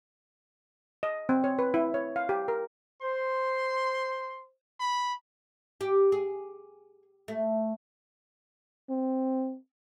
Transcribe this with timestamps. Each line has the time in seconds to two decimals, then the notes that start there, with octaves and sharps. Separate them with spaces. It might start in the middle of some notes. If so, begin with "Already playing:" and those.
1.03 D#5
1.29 C4
1.44 C#5
1.59 B4
1.74 E4
1.94 C#5
2.16 F5
2.29 G4
2.48 A#4
3.02 C5 C6
4.80 B5
5.81 G4
6.12 G#4
7.28 A3
8.90 C4